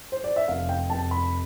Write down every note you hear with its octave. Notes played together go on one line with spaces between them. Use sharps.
C5
D5
E5
F1 F5
G5
F1 A5
B5